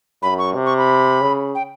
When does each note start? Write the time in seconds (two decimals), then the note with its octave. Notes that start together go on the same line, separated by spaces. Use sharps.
0.22 F#2 B5
0.38 C#6
0.55 C3
0.66 C#6
0.78 B5
1.21 C#3
1.55 G5